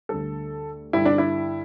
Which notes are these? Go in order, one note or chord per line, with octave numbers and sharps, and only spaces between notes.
D2 D3 G3 A4
G2 D3 G3 E4
D4
E4